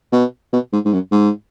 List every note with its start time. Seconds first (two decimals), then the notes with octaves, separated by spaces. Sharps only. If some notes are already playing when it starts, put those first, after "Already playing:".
0.12 B2
0.53 B2
0.73 G#2
0.85 G#2
0.93 F#2
1.12 G#2